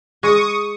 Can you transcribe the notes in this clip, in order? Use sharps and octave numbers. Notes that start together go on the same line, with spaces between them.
G#3 C#6 D#6